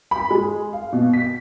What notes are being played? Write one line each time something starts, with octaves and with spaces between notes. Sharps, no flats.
B5
G#3
F5
B2
B6